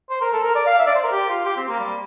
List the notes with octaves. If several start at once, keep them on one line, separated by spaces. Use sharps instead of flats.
C5
A#4
A4
A#4
D5
F5
E5
D5
C5
A#4
G4
F4
G4
C4
A#3
G3